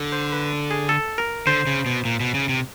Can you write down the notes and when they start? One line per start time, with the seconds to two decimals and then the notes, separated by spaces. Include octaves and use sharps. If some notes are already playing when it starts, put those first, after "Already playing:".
Already playing: D3
0.12 C5
0.32 B4
0.71 G#4
0.89 A4
1.18 A#4
1.47 D3 C5
1.67 C#3
1.86 B2
2.05 A#2
2.20 B2
2.34 C#3
2.49 C3